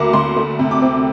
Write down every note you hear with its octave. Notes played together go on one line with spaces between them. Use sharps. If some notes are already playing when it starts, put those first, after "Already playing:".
Already playing: D2 A#3 A#5 D6
D2 C6
A3
C3
D6
C4